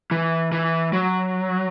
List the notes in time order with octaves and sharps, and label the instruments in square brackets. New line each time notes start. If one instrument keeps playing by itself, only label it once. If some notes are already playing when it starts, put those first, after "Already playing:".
[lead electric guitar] E3
E3
F#3